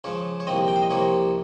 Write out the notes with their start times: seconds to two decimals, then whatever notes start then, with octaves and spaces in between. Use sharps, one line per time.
0.04 C#2 C#3 F3 C#5
0.40 C#5
0.47 C2 A#2 F3 C4 D#5
0.68 G5
0.76 F5
0.83 D#5
0.90 C2 C3 F3 A#3 C#5